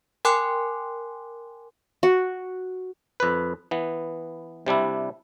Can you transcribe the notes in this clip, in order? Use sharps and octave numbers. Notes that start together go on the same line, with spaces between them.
A#4 G5 G#5 C6 D6 F#6
F#4
F2 B4
E3 B3
C3 G3 D4 E4